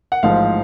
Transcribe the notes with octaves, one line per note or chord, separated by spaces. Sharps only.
F#5
A1 G#2 F3 F5